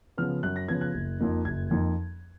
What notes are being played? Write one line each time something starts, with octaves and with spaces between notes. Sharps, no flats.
C#3 F3 B3 F6
F#2 F#6
A#6
C#3 F3 B3 G#6
F#6
F#1
F2 F3 A#3 D#4
F#1 G#6
F2 F3 A#3 D#4